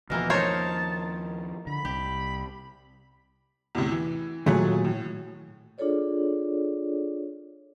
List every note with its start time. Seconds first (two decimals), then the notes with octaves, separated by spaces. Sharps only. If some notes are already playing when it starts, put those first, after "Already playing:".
0.10 D#2 B2 E3 F3 A#3 A#4
0.30 D#4 A#4 C5 C#5 A5
1.67 D3 B5
1.85 C2 G4
3.75 E2 A2 C3
3.91 E3
4.46 D#2 A#2 F#3 A3 G#4
4.84 A2
5.78 D4 F4 G#4 A4 C#5 D5